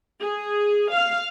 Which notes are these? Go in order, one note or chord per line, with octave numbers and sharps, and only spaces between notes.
G#4
F5